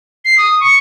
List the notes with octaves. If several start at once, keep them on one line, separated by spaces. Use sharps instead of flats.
C7
D#6
C#6